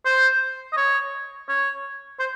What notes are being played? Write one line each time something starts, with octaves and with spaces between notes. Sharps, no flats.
C5
D#5
C#5
C#5
C5